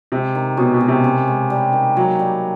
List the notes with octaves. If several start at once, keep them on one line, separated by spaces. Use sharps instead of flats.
C3 G#3
D#3
B2 C#4
B2
G#3
C3
C#4
G#3
G3
D#3
F#3 A#3
G3